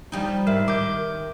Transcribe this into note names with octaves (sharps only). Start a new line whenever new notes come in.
F3 G3 D#4
G#2 A#4 E5
D#3 D6 G6